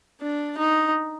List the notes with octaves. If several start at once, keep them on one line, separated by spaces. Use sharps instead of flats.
D4
D#4